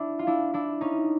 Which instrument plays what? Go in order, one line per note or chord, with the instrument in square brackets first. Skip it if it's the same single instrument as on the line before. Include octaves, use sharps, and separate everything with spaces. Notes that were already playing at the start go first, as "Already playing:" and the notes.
Already playing: [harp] D4 E4
F4
D4 E4
D4 E4
C#4 D#4